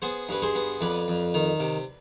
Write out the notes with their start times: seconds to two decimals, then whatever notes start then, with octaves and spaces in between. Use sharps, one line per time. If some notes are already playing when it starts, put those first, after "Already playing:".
0.02 B3 G#4 C5
0.29 G2 B4
0.42 G#4 C5
0.55 B3
0.81 F2 B4 D5
1.08 F2
1.34 D#3
1.60 C3